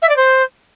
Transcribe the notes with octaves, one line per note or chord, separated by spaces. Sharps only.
E5
D5
C5